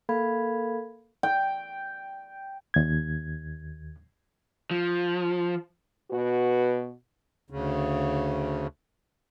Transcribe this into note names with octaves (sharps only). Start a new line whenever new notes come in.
A#3 A4 A#4 F5 B5 G#6
G5
D#2 G#6
F3
B2 F#4 B4
D2 C#3